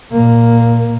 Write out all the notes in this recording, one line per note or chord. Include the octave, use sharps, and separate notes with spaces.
A#2 A#3